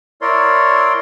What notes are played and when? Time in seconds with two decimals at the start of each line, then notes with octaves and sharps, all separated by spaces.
0.21 E4 A#4 C#5 D5 C6